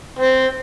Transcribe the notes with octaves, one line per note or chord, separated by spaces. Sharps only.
C4